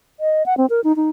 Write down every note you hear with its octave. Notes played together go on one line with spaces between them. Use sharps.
D#5
F#5
C4
A#4
D#4
D#4